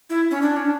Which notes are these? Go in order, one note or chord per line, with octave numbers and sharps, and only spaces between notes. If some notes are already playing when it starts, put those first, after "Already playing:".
E4
C#4
D4
C#4
D4